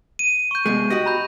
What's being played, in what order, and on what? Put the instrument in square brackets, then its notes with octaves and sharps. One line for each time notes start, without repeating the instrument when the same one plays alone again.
[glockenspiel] D#7
C#6 G6
[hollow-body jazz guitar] C2 B2 G#3
F#4 G4 D#5
[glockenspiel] A#5 B5 G6